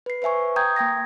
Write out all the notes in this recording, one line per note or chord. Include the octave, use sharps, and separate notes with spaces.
B4 C7
B4 C5 E5 G#5 C#6
G5 A#5 D#6 G6 G#6
A#3 G5 G#6 A#6